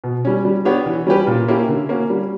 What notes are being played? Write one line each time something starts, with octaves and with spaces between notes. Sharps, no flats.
B2
G3 C#4
G3
B3 D4 G4 C#5
E3
G3 C#4 G4 B4
A#2
A#3 C#4 E4 G4
D3
A#3 C#4 F#4
G3